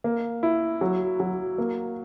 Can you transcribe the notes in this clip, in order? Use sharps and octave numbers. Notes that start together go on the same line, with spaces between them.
A#3
E4
F#3
F#3
A#3